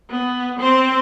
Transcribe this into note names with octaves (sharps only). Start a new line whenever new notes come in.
B3
C4 C5